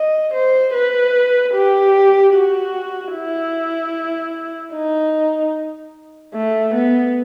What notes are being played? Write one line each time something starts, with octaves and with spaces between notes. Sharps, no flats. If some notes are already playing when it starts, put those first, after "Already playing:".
Already playing: D#5
C5
B4
G4
F#4
E4
D#4
A3
B3